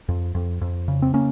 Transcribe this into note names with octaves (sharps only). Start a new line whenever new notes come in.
F2
F2
F2
C#3
C4
A#3 C#4